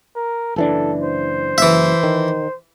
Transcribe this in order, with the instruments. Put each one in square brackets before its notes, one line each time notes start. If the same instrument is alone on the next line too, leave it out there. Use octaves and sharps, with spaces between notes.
[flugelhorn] A#4
[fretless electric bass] F#1 E3 D4 [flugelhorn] A4
[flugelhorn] C5
[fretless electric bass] F#1 [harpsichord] E3 E5
[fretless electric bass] D#3